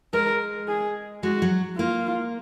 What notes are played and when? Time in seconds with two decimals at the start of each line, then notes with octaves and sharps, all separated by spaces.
0.13 G#3 A#4
0.68 G#4
1.23 G#3 F#4
1.42 F#3
1.78 A#3 F4